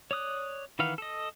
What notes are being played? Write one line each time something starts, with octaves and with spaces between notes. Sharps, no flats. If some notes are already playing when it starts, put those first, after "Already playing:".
C#5 D5 D#6 F#6
D#3 E3 B4 F5 F#5
A4 D#5